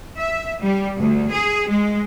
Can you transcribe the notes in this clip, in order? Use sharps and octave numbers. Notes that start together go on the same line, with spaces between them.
E5
G3
D2
G#4
G#3